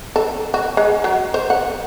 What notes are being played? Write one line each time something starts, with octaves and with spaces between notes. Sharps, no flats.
A4
F#4
G#3
F#3
C5
F#5